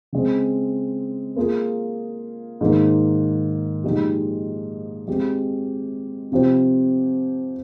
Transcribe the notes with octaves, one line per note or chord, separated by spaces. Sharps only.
C#3 G#3 C4
A#3 F4 G#4
G#2 D#3 A#3
A#2 F3 G#3 D#4 G4
G#3 C4 G4
C3 F3 C4 G4 C5